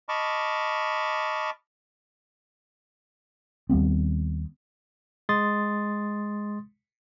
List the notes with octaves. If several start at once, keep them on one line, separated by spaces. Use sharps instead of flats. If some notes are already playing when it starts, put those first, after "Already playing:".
D#5 A5 B5 C#6 D6 F6
D#2 G3 B3 C4
G#3 C6 D#6 A6